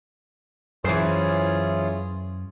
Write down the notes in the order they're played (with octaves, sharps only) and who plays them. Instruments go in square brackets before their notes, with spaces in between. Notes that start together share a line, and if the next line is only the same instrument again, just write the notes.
[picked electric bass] F#2 [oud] E3 C5 [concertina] C#4 F4 G#4